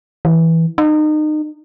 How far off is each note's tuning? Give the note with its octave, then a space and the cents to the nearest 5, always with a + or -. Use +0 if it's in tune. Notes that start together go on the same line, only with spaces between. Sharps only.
E3 -10
D#4 -30